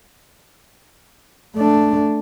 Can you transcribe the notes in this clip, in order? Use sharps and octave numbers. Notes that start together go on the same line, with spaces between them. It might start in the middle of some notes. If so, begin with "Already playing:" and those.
A3 D4